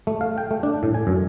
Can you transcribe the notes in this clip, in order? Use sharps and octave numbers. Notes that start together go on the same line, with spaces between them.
A3
F5
G5
A3
D4
A2
G#5
F#2